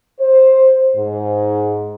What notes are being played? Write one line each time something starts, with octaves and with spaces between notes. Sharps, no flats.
C5
G#2